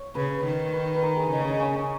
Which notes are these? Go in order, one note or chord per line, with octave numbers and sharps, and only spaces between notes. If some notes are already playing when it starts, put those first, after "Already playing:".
Already playing: C#5
C#3 B4
D#3
B4
B4
A#4
G#4
C#3 D#5
C#5
D#4
C#4
C#4